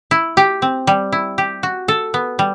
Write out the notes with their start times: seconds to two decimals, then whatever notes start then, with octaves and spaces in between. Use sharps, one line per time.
0.11 E4
0.37 G4
0.62 C4
0.87 G3
1.12 E4
1.38 G4
1.63 F#4
1.88 A4
2.14 B3
2.39 G3